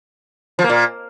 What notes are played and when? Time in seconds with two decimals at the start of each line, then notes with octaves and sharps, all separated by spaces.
0.59 F3
0.64 A#3
0.70 A#2